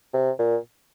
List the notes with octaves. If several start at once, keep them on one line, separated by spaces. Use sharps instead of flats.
C3
A#2